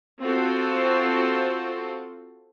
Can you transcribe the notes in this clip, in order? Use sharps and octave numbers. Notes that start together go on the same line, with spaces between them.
C4 F4 F#4 A4 C5